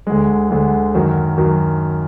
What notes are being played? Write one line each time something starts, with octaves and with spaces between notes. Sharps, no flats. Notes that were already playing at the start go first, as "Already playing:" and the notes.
D2 D3 G#3
D2 D3 G#3
F#2 D#3 F#3
F#2 D#3 F#3